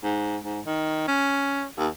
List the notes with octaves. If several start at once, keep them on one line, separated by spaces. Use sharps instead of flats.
G#2
G#2
D#3
C#4
D#2